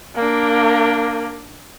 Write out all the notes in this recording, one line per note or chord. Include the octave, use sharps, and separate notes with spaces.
A#3 D4